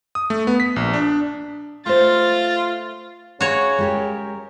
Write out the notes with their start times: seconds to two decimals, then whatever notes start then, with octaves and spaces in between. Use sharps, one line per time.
0.15 D#6
0.30 A3
0.47 B3
0.60 B6
0.76 A#1
0.93 D4
1.86 A3 F4 C5 A6
3.41 C#3 F#4 C#5
3.78 G#3 G4 A#4